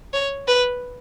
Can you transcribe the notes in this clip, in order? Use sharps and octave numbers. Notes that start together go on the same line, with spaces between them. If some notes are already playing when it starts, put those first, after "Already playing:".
C#5
B4